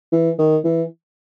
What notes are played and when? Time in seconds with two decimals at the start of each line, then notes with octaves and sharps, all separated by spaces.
0.12 E3
0.39 D#3
0.65 E3